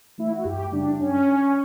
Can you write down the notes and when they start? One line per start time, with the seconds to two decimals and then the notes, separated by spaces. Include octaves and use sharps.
0.18 E3 A3 E4
0.32 F#4
0.44 F#2 G4
0.72 C#3 G3 D4
1.00 F#2 C#4